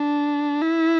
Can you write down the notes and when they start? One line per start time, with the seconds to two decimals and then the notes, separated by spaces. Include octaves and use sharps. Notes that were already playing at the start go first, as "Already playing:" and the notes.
Already playing: D4
0.62 E4